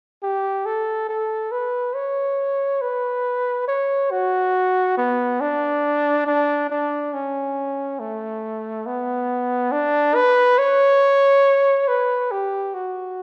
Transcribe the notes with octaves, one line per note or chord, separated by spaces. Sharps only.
G4
A4
A4
B4
C#5
B4
C#5
F#4
B3
D4
D4
D4
C#4
A3
B3
D4
B4
C#5
B4
G4
F#4